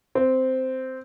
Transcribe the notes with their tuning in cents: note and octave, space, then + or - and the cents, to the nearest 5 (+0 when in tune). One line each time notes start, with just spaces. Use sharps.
C4 -10